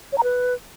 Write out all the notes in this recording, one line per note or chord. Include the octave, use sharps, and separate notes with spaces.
C#5
A#5
B4